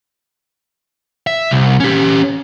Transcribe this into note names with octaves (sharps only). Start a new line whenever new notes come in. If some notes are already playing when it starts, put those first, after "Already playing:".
E5
C2
C#4 G4